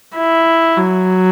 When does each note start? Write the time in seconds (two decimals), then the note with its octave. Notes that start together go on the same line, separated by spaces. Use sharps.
0.17 E4
0.78 F#3